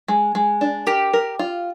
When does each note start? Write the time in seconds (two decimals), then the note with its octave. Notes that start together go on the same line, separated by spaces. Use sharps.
0.08 G#3
0.35 G#3
0.61 D4
0.87 G4 A#4
1.13 A#4
1.39 F4